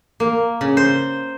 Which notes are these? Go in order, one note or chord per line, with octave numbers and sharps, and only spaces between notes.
A#3
C#3
C5